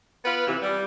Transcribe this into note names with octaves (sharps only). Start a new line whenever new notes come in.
B3 F4 B4
C3 E3
G3